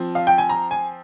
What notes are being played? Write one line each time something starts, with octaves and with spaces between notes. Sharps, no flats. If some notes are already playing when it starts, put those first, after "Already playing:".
Already playing: F3 C4
F5
G5
G#5
A#5
G#5